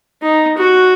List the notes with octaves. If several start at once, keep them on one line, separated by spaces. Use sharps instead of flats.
D#4
F#4